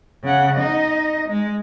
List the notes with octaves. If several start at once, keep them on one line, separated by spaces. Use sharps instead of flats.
C#3 F#5
D#4 D#5
G#3